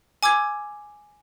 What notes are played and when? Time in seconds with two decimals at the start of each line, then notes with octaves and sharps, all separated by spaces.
0.23 G#5 D6 E6 G#6